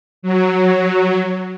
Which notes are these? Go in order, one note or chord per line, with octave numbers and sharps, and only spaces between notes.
F#3